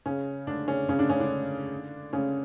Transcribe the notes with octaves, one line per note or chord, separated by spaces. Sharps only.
C#3 C#4
D3 D4
C#3 C#4
C#3 C#4
D3 D4
C#3 C#4
D3 D4
C#3 C#4